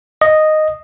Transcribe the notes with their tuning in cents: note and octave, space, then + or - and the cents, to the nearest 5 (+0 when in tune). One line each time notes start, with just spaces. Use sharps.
D#5 -5